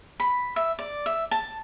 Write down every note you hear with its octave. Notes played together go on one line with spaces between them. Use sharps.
B5
E5
D5
E5
A5